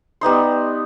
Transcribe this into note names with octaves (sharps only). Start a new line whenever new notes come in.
G3 B3 D#4 C6